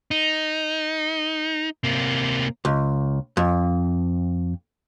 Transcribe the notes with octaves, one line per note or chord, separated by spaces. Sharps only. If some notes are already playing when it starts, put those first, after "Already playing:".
D#4
C3 A#3
C#2
F2